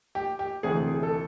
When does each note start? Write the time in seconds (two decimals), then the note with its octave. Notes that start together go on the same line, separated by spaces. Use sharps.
0.15 G4
0.39 G4
0.63 D2 C3 E3 G#4
0.88 G#4
1.03 A4